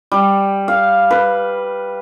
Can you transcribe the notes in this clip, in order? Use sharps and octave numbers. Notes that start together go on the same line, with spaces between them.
G3
F5
B4